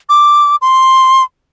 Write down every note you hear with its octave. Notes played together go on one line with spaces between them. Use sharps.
D6
C6